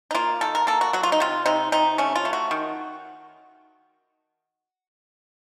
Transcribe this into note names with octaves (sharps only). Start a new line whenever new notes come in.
D#4
A#3 F4
D#3 A4
A#4
A#3 A4
F#4
F#3 F#4
F4
D#4
C3 F4
C3 D#4
C3 D#4
A3 C#4
F4
A3
F#4
D#3